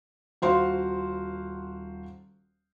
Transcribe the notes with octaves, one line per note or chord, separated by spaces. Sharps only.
D#1 F#4 C5 F5 C6